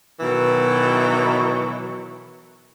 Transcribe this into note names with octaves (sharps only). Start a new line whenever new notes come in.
B2 D#3 E3 F#3